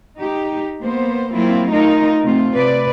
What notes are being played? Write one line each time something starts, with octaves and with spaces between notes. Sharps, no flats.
D#4 G4
A#3 B3 C5
F#3 A#3 C4 E4 F4
A3 D#4 F4 A#4
C3 A3 C4 F4
C3 B4 D5